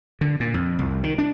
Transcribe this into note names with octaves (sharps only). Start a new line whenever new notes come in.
D3
A#2
F2
C2
D#3
D4